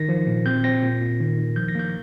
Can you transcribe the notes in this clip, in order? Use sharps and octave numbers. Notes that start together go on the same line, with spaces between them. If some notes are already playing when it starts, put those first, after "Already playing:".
Already playing: D#3 A#6
F3
A#2
C4 G6
C4 A#6
A#2
A#2
D#3
D#3
F3 G6
A#6
A#3 G6